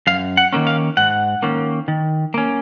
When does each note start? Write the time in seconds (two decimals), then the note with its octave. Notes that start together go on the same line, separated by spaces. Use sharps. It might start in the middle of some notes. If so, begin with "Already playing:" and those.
0.07 F#2 F5
0.37 F#5
0.53 D#3 A#3 C#4
0.67 F5
0.97 G#2 F#5
1.43 D#3 A#3 C#4
1.88 D#3
2.34 A#3 C#4